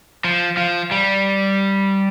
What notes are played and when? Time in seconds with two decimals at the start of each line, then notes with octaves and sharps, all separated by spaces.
0.24 F3
0.57 F3
0.91 G3